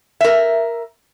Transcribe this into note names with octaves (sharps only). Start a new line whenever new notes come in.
A#4 E5